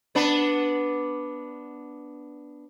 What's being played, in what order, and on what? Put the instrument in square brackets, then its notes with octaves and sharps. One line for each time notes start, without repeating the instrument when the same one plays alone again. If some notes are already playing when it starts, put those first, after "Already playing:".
[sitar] B3 D4 B4